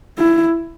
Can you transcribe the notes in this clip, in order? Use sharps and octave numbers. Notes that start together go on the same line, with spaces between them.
E4